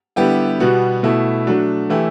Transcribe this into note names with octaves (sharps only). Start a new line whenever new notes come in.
D3 G3 B3 E4 G4
B2 G3 B3 F#4
B2 A3 E4
F#3 A3 D4 F#4
E3 A3 E4 G4